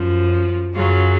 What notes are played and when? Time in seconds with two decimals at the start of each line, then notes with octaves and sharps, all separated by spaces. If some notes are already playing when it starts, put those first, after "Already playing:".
Already playing: F#2 F3
0.74 F#2 C#3 F#3 F4